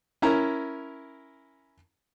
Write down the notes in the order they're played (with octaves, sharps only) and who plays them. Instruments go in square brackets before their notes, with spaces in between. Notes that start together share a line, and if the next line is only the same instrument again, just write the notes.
[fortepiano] C#4 E4 A#4 A#5